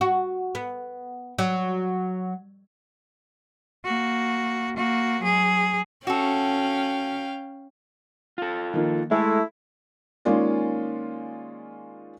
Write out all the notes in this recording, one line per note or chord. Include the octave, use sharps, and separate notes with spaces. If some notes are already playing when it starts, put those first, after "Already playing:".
F#4
B3
F#3
A#3 F#4
A#3 F#4
F#3 G#4
C#4 F#4 A4 F5 G5
F4 A4
D#3 F3 A#3
G#3 A3 E4 A4
D#3 G#3 A#3 C#4 F4 D5